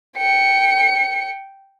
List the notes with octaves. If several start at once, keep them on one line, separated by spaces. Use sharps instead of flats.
G5 C#7